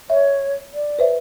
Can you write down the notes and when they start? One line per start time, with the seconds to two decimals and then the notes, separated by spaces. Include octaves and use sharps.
0.10 C#5 E5
0.73 D5
0.99 B4 C5 E5